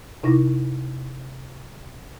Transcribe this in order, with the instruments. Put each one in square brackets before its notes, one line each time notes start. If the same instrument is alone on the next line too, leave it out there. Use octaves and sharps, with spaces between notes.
[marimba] C3 D#4 E4 A#6